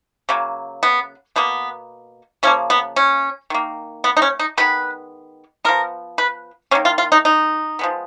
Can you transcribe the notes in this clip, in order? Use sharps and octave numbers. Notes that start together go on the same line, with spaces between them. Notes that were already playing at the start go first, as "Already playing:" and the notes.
C#3 F#3 A#3
B3
B2 A#3 B3
C#3 F3 A#3 C#4
B3
C#4
D#3 A#3
B3
D#4
C#4
D#4
D#3 G#3 B3 B4
F3 B3 A#4
B4
D#3 A#3 C#4
F4
F4
D#4
D#4
F3 G#3 B3